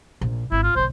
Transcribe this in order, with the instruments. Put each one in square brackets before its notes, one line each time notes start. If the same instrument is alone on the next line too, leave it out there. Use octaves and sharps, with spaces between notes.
[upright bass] A#1
[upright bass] G#1 [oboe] E4
[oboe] F4
[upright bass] B1 D3 [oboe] C5